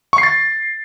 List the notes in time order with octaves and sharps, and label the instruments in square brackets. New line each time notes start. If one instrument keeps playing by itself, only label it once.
[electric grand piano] C#6
C7
A6